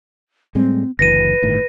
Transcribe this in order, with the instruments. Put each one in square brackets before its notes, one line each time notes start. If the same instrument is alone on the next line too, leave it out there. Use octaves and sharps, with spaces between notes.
[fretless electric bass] A2 G3 G#3 [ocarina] C4
[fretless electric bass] F#1 D2 E3 [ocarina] B4 [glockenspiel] A#6 C#7 D#7
[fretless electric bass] G1 A2 D#3